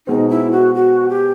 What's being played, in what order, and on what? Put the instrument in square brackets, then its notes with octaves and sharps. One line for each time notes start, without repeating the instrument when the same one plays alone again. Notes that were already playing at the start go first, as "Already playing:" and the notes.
[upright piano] B2 G#3 C4 [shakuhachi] D#4
[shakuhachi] E4
F#4
F#4
G4